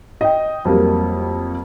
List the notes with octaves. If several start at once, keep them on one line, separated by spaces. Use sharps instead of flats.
D#5 G5
F2 F#3 G3 A#3